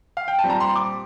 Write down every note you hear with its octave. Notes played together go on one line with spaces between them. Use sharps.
F5
G5
A5
A#2 G3 C4
A#5
C6
D6